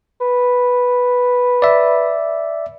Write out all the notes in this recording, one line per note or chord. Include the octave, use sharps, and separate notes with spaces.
B4
D5 E5